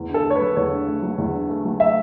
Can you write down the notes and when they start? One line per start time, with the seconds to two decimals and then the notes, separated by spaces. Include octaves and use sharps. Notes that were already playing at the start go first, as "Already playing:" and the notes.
Already playing: E2
0.09 D3
0.14 A4
0.25 A3
0.30 C#5
0.35 B4
0.41 F#3
0.56 E2 C#5
0.71 D3
0.87 A3
1.03 F#3
1.18 E2
1.34 D3
1.49 A3
1.65 F#3
1.80 E5